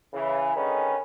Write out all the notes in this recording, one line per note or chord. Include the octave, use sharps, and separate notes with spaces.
C#3 E3
D3 D#3 G#3 C#4 G#4 B4